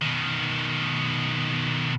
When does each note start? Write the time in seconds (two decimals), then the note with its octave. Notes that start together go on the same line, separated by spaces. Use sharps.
0.02 B2 D#3